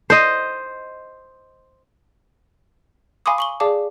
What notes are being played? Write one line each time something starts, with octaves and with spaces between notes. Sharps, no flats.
C5 D#5
F5 G#5 B5 C6 D6 D#6
C#6 F#7 G7
G#4 D5 F5 A5 D6